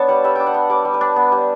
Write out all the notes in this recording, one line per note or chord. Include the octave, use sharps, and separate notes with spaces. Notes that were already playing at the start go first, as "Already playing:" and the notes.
Already playing: B3 D4 C#5 A5
G3 F#5
G3 E5
D4 G5
F#5
B3
G3 D5
G3
B4
D4
B3
G3